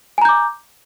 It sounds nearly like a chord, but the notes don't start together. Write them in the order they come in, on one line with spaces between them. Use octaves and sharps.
G#5 A#5 G6 D6